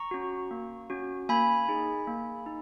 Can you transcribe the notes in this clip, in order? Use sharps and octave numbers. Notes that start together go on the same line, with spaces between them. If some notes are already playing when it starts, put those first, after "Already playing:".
Already playing: A#5 C#6
C#4 F#4
A#3
C#4 F#4
A#3 G#5 B5
D#4 G#4
A#3
D#4